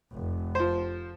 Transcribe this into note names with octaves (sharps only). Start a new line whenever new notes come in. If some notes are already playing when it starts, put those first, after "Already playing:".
F1
F3 C5